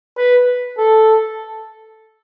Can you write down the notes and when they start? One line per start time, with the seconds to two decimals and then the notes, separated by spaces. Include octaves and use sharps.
0.17 B4
0.78 A4